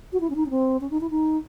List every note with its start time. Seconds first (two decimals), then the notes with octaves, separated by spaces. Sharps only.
0.13 F#4
0.21 E4
0.30 C#4
0.36 D#4
0.46 C#4
0.50 C4
0.81 C#4
0.91 D#4
1.01 E4
1.10 D#4